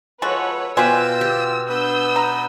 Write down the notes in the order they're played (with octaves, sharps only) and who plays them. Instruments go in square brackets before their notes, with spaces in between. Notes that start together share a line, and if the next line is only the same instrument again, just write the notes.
[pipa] F3 G#3 F#4 [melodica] A4 [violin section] B4 C#5 F#5
[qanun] B2 B4 [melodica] F4 G5 [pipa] C5 D5 G#5 [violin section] E6
[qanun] G4
[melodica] B3 B4 [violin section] D4 E6 G6
[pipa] A#5